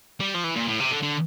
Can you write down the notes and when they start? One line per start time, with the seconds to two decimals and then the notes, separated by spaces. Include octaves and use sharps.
0.20 G3
0.34 F3
0.44 E3
0.55 A#2
0.67 A2
0.80 C3
0.91 D3
1.03 D3